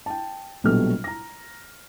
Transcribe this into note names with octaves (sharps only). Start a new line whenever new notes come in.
G5 A5
A#1 B2 F#3 G3 A4 F6
A#5 A#6